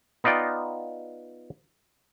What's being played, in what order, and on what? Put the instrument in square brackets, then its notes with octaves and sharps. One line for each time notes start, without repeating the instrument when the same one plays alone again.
[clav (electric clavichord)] B3 D#4 F4 D5 G5